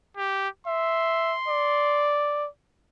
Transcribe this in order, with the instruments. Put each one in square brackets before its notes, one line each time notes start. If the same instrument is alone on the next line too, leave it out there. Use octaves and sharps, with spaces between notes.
[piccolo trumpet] G4
[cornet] E5 [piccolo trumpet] C6
[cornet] D5